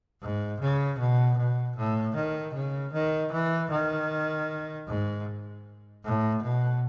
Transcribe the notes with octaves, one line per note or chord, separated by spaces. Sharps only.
G#2
C#3
B2
B2
A2
D#3
C#3
D#3
E3
D#3
G#2
A2
B2